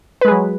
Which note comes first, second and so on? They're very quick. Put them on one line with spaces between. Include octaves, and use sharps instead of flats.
B4 G#3 G#4 F#3